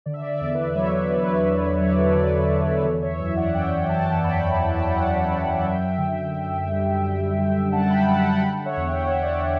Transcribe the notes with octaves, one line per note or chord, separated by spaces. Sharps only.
D3 D5
E5
D5
E5
D5
E2
E5
B4 D5
F#3 C#5 E5
B4
F#3 B4
B4
E2
F#3 C#5
D5
A4 C#5
D3 B4 D5
B4
E2
B4 D5
E3 A4 C#5
C#5 E5
F#2 C#5 E5
E5
D5 F#5
F#2 E5 G5
G5
E3 F#5 A5
F#2 G5 B5
E3 B5
A5
G5 B5
F#2 F#5 A5
F#2
F#2 E5 G5
D3
F#2
G3
G3
D3
F#2 F#5 A5
A5
G5 B5
F#2 F#5 A5
F#5 A5
D3 G5 B5
F#5
C#5 E5
E2
G5
F#5
E2 E5
D5 F#5